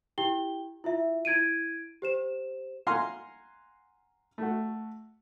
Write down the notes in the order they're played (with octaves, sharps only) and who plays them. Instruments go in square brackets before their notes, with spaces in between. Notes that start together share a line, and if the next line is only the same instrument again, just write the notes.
[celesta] E4 G4 G5 G7
E4 F4 E5
E4 G#6 D7 D#7
G4 C5 E7
[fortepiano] F5 F#5 G#5 A#5 C6
A3 F#4